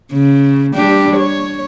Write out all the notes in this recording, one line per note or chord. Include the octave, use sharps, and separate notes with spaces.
C#3
G3 D4 G4
C#5